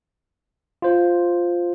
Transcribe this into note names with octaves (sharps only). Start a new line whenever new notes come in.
F4 C5